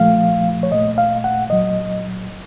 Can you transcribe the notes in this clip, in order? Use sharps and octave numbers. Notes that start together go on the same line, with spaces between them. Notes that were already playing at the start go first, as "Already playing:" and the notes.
Already playing: A#2 F3 A3 F5
C#5
A#2 A3 D#5
F5
F#5
A#2 F#3 D#5